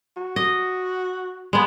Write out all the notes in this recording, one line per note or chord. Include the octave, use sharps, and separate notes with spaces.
F#4
D#5
G#3 B3